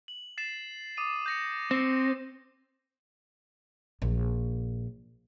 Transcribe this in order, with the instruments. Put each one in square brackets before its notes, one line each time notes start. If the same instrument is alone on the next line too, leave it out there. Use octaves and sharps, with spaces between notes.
[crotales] F#7
A6 C7 E7
D6 D#6 D#7
G6 A#6 C#7
[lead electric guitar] C4 [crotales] A#6 C#7
[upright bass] A#1